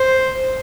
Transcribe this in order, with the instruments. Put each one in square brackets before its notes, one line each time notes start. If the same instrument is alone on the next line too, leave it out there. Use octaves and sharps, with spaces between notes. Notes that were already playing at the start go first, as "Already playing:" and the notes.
Already playing: [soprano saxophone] C5